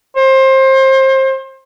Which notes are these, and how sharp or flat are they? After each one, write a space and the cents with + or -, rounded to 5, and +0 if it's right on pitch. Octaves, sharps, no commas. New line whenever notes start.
C5 +25